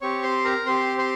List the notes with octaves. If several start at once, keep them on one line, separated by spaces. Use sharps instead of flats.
C4 G4 C#5 C#6
C5 C6
A#4 A#5
C4 G4 C5 C6
C5 C6